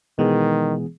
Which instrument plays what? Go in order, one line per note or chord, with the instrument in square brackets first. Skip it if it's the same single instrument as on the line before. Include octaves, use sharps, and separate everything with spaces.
[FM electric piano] B2 G#3 [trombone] D#3 [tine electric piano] E3 B3 G#4